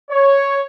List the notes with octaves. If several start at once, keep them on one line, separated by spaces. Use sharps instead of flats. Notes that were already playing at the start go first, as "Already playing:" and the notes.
C#5